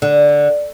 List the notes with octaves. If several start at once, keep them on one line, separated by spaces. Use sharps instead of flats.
D3